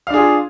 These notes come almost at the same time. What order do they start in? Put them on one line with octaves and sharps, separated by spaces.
F5 D4 G#4 F4